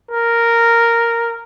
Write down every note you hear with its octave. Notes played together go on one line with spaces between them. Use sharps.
A#4